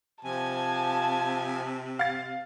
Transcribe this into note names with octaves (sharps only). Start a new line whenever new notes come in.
C3 F3 G#5 A5
F5 A6